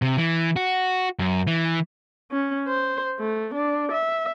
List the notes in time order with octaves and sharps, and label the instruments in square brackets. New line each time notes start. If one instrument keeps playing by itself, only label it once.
[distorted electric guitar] C3
E3
F#4
F#2
E3
[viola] C#4
C5
A3
D4
E5